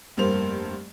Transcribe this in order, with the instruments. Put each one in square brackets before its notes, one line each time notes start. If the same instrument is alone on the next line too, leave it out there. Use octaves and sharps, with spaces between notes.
[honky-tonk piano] F1 G2 A#3 C5 F7